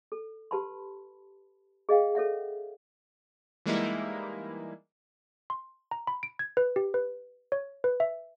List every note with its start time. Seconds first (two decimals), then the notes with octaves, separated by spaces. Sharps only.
0.12 A4
0.51 G4 B4 A5 B5 C6
1.89 G#4 D#5 F5 G5
2.15 A4 C#5 E5 F#5
3.66 E3 G3 G#3 A#3 D#4 E4
5.50 C6
5.91 A#5
6.07 B5
6.23 D7
6.39 G#6
6.57 B4
6.76 G4
6.94 B4
7.52 C#5
7.84 B4
8.00 E5